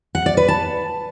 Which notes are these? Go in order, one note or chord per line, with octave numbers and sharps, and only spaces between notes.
F#5
D5
B4
A5